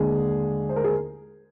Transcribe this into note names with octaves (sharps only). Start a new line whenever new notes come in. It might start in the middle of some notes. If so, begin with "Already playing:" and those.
Already playing: D#2 D3 G#3 D4 G#4
C5
A#4
G#4